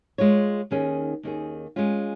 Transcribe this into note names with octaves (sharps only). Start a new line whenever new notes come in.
G#3 F4 C#5
D#2 D#3 C#4 G#4
D#2 D#3 C#4 G#4
G#3 C#4 F4